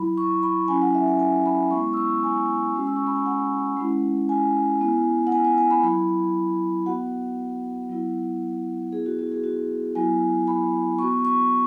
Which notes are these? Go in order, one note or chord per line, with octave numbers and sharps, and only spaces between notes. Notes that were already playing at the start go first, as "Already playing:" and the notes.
Already playing: F#3 E4 B5
C#6
B5
F#3 C#4 E4 G#5
F#5
E5
F#5
G#5
B5
G#3 B3 E4 C#6
E6
C#6
G#5
G#3 C#4 F#4
E6
C#6
B5
G#5
F#5
G#3 C#4 E4
G#5
B3 E4
F#5
G#5
G#5
G#5
B5
F#3 E4 B5
B3 F#4 F#5
F#3 B3 E4
B3 E4 G#4
F#4
F#4
G#4
F#4
F#3 B3 E4 G#5
B5
B3 F#4 C#6
C#6